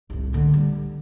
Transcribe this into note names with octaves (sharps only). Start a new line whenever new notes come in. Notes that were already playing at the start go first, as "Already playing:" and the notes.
C2 A2
D3 A3
G3